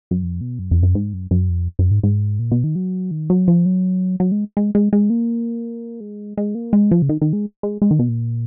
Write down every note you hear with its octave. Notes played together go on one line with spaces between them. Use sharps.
F#2
F2
B2
F#2
F2
F#2
G#2
F#2
F#2
F2
F#2
G#2
G#2
A#2
B2
D#3
F#3
D#3
F#3
F3
F#3
F#3
G#3
G#3
G#3
G#3
A#3
G#3
G#3
A#3
G#3
F3
C#3
D#3
D#3
G#3
G#3
G#3
D#3
B2
A#2